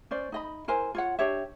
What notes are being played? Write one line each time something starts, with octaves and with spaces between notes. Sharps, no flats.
C#4 C5 D5
D#4 D#5 B5
E4 A#4 C5 G#5
F4 C#5 F#5
D4 G4 C#5 E5